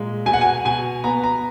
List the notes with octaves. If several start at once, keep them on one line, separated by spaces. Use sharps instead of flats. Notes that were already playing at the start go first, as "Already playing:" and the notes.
Already playing: A#2 G#3
B2 G#5
F#5
G#5
B2 G#5
B3 A#5
A#5